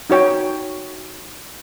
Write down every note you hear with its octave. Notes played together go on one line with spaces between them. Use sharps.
D#4 F#4 C#5 G5